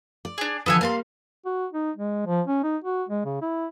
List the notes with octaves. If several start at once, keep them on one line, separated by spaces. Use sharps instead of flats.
D5
D4 G#4
D3 E3 F3 B3 A4 G#5
G3 A#3 F5 A5 C6
F#4
D#4
G#3
F3
C#4
D#4
F#4
G#3
C#3
E4